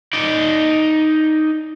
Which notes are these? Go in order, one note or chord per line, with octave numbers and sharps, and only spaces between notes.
D#4 D5